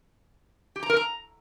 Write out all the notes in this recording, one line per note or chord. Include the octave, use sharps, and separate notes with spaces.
G4
A#5
A#4
A#5